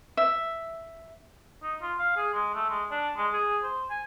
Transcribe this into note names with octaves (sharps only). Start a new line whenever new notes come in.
E5
D#4
F4
F5
G#4
G#3
A3
G#3
D4
G#3
G#4
C5
G#5